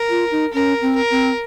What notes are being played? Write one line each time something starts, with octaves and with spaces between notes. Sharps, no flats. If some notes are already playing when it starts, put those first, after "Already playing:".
Already playing: A#4
F4
D#4
C#4 A#4
C4
A#4
C4